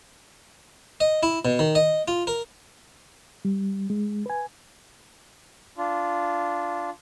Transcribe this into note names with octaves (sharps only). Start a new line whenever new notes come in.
D#5
E4
B2
D#3
D#5
F4
A#4
G3
G#3
B4 G#5
D4 F4